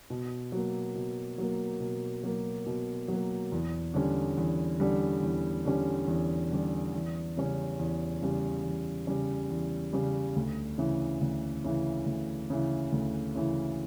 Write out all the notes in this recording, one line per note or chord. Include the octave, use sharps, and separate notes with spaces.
B2
F#3 A#3
B2
F#3 A#3
B2
F#3 A#3
B2
F#3 A#3
E2
D3 G3 C#4
E2
D3 G3 C#4
E2
D3 G3 C#4
E2
D3 G3 C#4
E2
C#3 G3 C#4
E2
C#3 G3 C#4
E2
C#3 G3 C#4
E2
C#3 G3 C#4
D2
C#3 E3
D2
C#3 E3
D2
C#3 E3
D2
C#3 E3